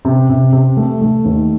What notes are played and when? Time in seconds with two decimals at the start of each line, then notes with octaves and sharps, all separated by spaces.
0.05 C3
0.30 C3
0.53 C3
0.77 A3
1.01 A3
1.25 D#2